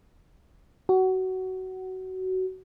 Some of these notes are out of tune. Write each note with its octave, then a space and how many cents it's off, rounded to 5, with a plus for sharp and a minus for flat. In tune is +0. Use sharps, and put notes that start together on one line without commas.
F#4 +20